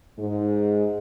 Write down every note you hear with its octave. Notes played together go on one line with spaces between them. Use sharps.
G#2 G#3